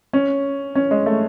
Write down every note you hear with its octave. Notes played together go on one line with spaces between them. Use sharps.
C#4
C#4
G#3
A3